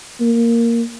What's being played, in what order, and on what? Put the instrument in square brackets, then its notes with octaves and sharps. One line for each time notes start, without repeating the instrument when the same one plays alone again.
[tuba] A#3